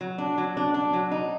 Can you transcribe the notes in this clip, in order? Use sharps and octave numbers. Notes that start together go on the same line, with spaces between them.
F#3
D4
F#3
D4
D4
F#3
D#4